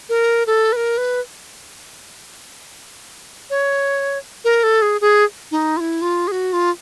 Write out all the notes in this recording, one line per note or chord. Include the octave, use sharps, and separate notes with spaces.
A#4
A4
B4
A#4
B4
C#5
A#4
A4
G#4
G#4
D#4
F4
E4
F4
G#4
F#4
F4